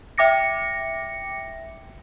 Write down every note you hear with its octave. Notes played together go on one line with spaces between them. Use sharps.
E5 G5 D6 A#6 C#7